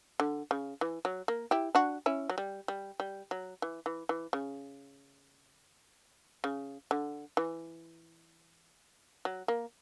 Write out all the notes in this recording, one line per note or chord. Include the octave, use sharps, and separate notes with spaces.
D3
C#3
E3
F#3
A#3
E4 G4
D4 F#4
C#4 E4
F#3
G3
G3
G3
F#3
E3
E3
E3
C#3
C#3
D3
E3
F#3
A#3